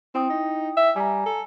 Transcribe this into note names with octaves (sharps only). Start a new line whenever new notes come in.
C4 E4 G5 D#6
D#4
E5
G3 G#5 A#5
A4